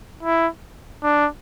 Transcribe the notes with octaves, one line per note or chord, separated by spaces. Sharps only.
E4
D4